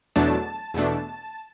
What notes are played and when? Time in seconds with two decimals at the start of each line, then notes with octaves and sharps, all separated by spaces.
0.16 E2 B2 F#3 A3 D4 A5
0.74 E2 B2 A3 D4